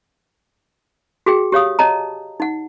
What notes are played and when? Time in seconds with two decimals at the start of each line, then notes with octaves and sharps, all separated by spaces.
1.26 F#4 G#4 G5
1.52 G4 C#5 F5 D#6
1.79 C#5 D#5 A5 A#5
2.40 D#4 F#5